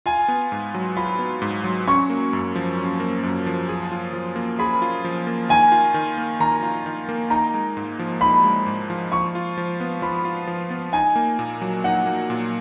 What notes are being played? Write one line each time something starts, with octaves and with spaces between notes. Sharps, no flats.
F4 G#5
B3
G#2
F#3
F4 B5
B3
G#2
F#3
C#4 C#6
A#3
F#2
F3
C#4
A#3
F#2
F3
G#4
F4
F3
A#3
G#4 B5
F4
F3
A#3
D#3 G#5
F4
D#3
A#3
D#3 A#5
F4
D#3
A#3
D#4 A#5
G#3
G#2
F3
D#4 B5
G#3
G#2
F3
F3 C#6
F4
F3
B3
F3 B5
F4
F3
B3
D#4 G#5
A#3
A#2
F#3
D#4 F#5
A#3
A#2